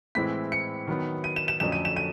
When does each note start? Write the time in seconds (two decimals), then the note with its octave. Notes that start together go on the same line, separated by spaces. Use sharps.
0.15 A2 E3 G#3 C4 E4 B6
0.52 C#7
0.87 D#3 F#3 B3
1.24 D#7
1.36 E7
1.48 E7
1.60 F2 D3 F#3 A3 C#4 E7
1.72 D#7
1.85 E7
1.96 D#7